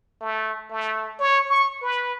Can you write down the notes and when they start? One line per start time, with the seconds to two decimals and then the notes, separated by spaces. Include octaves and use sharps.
0.21 A3
0.70 A3
1.19 C#5
1.49 C#6
1.82 B4